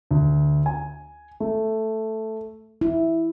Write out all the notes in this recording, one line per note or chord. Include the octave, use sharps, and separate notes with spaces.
D2
G#5
A3
E4